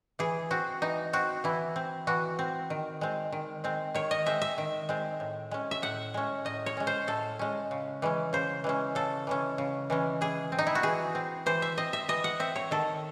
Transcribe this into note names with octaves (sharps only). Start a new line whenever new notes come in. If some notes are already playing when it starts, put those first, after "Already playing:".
E3 G#4
C4 F#4
E3 D#4
C4 F#4
E3 E4
C4
E3 F#4
C4
D#3
G#3 C4
D#3
G#3 C4
D#3 C#5
D#5
G#3 C4 E5
E5
D#3
G#3 C4
A2
G#3 C#4
E5
A2 F#5
G#3 C#4
A2 D#5
C#5
G#3 C#4
C5
A2 A4
G#3 C#4
C#3
E3 G#3 C#4
C#3 C5
E3 G#3 C#4
C#3 A4
E3 G#3 C#4
C#3
E3 G#3 C#4
E3 G#4
C4
D#4
E4
F#4
E3 G#4
C4
E3 C5
E5
C4 D#5
E5
E3 D#5
F#5
C4 E5
C#5
D#3 A4